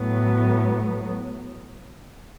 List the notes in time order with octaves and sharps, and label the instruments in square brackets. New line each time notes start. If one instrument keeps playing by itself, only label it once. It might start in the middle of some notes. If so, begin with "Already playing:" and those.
Already playing: [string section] A2 F#3 B3